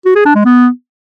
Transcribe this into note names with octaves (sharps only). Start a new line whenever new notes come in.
F#4
G#4
D4
G#3
B3